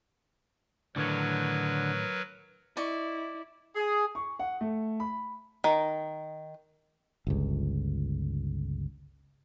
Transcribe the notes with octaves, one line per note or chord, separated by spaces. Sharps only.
A2 D3 D#3 F#3 A#4 B4 C#5
E4 D5 D#5 C#6
G#4
C#6
F#5
A3
B5
D#3
G1 C#2